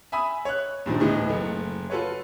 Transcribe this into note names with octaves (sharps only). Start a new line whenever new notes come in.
E5 G#5 B5 D#6
C#5 F#6
G2 A#2 D#3 F3
D2 A2 E3 B3 D#4
F#1 A3
F4 F#4 A4 B4 C#5